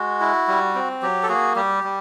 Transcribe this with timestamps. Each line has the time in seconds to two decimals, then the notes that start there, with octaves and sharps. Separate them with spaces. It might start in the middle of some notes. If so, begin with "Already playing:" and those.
Already playing: G#3 F#4
0.20 E4
0.48 G3
0.75 C4
1.02 F#3 G4
1.23 A4
1.29 A#3 F#4 G#4
1.56 G3 G4
1.84 G3